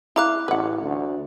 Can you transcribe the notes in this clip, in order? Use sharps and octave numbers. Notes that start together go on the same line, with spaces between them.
E4 F5 A#5 D6 F#6
A1 B4 F#5
D2